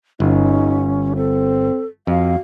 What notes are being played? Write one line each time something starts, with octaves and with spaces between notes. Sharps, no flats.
G1 C#4 D#4
C4 A4
F2 F#4 F5